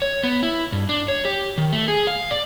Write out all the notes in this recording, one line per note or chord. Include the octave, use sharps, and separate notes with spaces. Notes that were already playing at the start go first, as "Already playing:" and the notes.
C#5
B3
E4
G2
D4
C#5
G4
D#3
A3
G#4
F5
D5